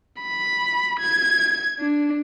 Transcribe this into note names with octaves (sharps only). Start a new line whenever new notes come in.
B5
G#6
D4